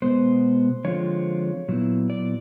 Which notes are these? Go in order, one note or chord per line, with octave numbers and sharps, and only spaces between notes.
B2 G#3 B3 C5
D3 F3 G#3 C4 F4 C#5
A#2 F#3 B3 E4
D5